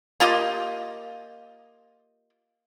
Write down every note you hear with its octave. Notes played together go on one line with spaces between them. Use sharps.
A#3 F4 G4 D#5